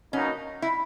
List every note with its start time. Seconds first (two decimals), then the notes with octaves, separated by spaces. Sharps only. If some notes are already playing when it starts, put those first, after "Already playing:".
0.13 B2 F#3 A#3 C#4 D#4
0.62 E4